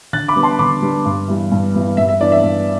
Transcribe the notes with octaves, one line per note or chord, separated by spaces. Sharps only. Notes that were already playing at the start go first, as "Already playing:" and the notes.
D3 F#6 A6
B5 D6
G3 B3 D4
A5 C6
D3 B5 D6
G3 B3 D4
G2
E3 G3 B3
G2
E3 G3 B3
G2 E5
E5
E3 B3 D4 D5
E5
G2